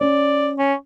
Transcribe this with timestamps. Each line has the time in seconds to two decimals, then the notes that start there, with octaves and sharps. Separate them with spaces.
0.01 C#4 D5
0.59 C#4